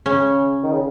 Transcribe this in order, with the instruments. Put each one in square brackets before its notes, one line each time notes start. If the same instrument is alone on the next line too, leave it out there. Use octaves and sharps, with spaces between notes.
[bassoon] C#3 [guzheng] C#4
[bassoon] D#3
C#3